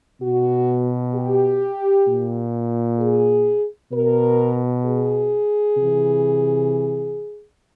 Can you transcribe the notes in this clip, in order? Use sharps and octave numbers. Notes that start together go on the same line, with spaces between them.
B2 F#4
G4
A#2
G#4
B2 A#4
G#4
C3 E3